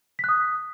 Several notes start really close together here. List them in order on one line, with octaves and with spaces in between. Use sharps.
B6 F#6 D#6